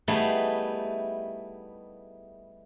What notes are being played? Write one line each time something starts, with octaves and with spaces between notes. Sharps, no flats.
G3 A3 B3 D#4 E4 G#4